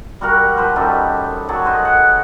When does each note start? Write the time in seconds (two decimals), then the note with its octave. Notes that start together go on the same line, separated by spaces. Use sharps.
0.21 G3 F#4 A#4 F#5
0.57 F3 B4 C5
0.76 F#2 G3 D#4 A4
1.49 F#3 G#4 A4
1.65 B4 C5 D#5
1.85 F#5